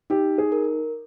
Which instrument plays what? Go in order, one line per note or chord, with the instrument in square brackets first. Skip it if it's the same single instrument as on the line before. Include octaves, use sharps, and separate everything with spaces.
[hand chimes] D#4 [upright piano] G4
[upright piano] G#4
[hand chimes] A#4